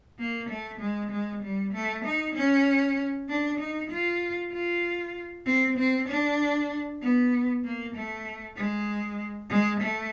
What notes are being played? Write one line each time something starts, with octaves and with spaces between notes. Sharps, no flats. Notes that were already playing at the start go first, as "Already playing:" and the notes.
A#3
A3
G#3
G#3
G3
A3
D#4
C#4
D4
D#4
F4
F4
C4
C4
D4
B3
A#3
A3
G#3
G#3
A3